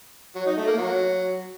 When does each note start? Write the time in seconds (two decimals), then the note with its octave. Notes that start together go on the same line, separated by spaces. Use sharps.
0.36 F#3
0.46 D#4
0.57 A3
0.67 A#3
0.78 F#3